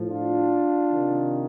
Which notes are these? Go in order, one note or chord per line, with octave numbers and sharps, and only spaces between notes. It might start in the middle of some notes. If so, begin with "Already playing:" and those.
Already playing: A2 F3
D4 F4
C3 D#3